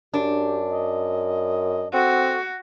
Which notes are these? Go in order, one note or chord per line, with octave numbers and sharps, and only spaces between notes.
F#2 D4 G4
D#5
C4 F#4 A4